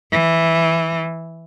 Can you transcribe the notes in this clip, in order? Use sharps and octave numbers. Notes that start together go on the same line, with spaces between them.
E3